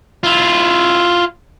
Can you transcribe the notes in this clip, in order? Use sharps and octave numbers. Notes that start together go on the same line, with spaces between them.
E4 F4